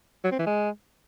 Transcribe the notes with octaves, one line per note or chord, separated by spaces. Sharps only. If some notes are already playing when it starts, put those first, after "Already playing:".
F#3
C4
E3
G#3